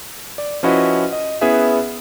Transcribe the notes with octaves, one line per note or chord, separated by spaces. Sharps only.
D5
F3 C#4 E4 F#4 B4 D#5
D#5
B3 C#4 E4 G#4 B4 E5